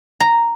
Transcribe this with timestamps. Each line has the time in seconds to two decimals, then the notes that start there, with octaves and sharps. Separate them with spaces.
0.20 A#5